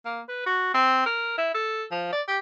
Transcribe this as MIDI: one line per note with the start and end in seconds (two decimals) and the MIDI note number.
0.05 0.21 58
0.28 0.42 71
0.46 0.70 66
0.74 1.01 60
1.06 1.36 70
1.37 1.50 64
1.54 1.84 69
1.91 2.08 53
2.12 2.22 74
2.28 2.38 67